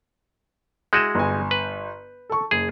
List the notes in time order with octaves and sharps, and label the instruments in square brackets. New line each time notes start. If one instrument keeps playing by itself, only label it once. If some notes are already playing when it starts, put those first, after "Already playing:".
[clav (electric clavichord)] G#3 E4 F#4 [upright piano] G6 D#7 E7
[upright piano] G1 G#5
[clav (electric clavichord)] B4
[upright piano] A4 C#6
[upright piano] F#1 [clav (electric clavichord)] G#4